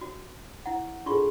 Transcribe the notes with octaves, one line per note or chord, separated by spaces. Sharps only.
F#4
E4 F#5
D4 F4 G#4 A4 C6 C#6